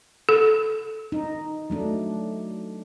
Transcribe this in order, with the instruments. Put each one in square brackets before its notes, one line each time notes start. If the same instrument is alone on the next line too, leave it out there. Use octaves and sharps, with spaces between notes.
[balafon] A4
[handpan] D#4
F#3 A3 D4